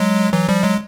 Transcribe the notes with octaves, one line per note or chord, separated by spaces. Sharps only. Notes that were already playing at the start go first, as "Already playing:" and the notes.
Already playing: F#3 G#3
E3 F#3
F3 G3
F#3 G#3